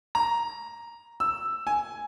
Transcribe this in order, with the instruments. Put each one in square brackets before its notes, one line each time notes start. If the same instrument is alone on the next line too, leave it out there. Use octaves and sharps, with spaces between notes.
[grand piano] A#5
E6
G#5